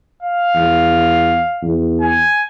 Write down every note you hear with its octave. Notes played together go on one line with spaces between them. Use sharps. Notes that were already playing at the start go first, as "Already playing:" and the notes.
F5
E2
E2
G#5